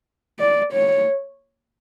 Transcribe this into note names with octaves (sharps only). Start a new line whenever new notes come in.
D5
C#5